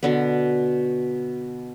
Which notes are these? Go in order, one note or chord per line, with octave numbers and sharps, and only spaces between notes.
B2 D3 B3